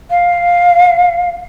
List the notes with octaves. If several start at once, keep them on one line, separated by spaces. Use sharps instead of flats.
F5